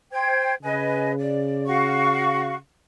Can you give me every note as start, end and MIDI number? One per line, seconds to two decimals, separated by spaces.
0.11 0.53 72
0.11 0.53 79
0.11 0.53 92
0.63 2.58 49
0.63 1.11 71
0.63 1.11 75
0.63 1.11 80
1.18 1.64 74
1.67 2.54 66
1.67 2.54 77
1.67 2.54 85